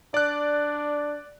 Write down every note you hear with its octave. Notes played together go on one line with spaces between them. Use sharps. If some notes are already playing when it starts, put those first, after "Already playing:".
D4 D5 F#6